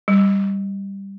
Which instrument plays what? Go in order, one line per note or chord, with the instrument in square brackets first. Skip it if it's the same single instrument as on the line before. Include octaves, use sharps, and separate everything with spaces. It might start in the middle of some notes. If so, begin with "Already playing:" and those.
[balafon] G3